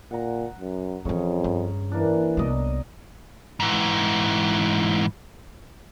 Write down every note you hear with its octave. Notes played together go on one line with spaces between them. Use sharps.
A#2 F#5 A#5
F#2
F2 C#3 E3 F3 C#5
G2
E3 A#3 D4
C2 B3 D5 D#5 A#5
G#2 E3